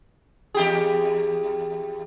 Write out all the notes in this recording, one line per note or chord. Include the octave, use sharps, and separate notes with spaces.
E2 G4 G#4